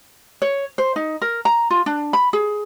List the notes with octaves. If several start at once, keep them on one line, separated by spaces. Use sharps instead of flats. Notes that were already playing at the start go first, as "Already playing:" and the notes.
C#5
C5
D#4
A#4
A#5
F4
D4
B5
G#4